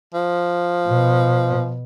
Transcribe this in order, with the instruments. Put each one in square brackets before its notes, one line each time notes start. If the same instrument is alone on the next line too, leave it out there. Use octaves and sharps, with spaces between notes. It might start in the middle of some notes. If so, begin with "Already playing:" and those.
[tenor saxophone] F3
[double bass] B2